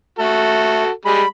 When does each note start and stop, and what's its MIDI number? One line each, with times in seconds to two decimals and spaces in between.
0.19 0.83 57
0.19 0.89 66
0.19 0.89 69
1.05 1.22 55
1.05 1.22 56
1.05 1.28 83